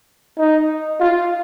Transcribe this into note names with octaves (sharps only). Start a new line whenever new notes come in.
D#4
F4